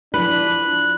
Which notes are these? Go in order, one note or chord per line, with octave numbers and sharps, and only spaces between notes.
F3 D4 E4 B4 F#6